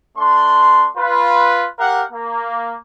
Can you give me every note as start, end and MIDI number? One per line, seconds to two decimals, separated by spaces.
0.17 0.88 57
0.17 0.88 62
0.17 0.88 84
0.97 1.67 65
0.97 1.67 71
1.79 2.02 67
1.79 2.02 70
1.79 2.02 77
1.79 2.02 78
2.11 2.76 58